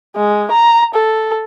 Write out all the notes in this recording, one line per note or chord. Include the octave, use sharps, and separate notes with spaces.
G#3
A#5
A4